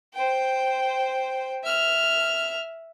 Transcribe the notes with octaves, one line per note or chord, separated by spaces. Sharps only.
C5 G5
E5 F6